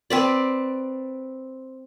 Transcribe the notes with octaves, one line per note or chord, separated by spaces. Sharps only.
C4 B4 D5